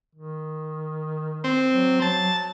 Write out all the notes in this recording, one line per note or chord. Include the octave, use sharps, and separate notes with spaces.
D#3
C4
F#3
F#3 A5